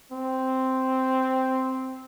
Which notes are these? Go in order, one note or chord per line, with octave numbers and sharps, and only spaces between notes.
C4